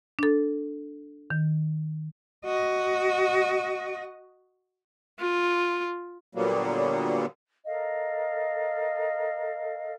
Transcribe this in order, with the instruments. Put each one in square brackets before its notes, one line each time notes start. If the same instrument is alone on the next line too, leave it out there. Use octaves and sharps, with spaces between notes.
[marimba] D4 A4
D#3
[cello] F#4 D#5
[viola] F4
[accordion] A#2 D3 F#3 G3 A#3 B3
[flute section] A4 A#4 D#5 F5